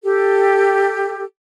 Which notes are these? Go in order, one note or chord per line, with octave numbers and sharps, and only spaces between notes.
G4 A4